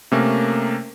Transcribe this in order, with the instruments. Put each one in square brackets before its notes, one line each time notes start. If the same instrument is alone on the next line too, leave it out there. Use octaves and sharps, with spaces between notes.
[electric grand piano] C3 A3 A#3 C#4 A#4